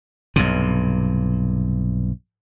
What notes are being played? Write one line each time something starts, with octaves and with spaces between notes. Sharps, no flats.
B1 G2 C3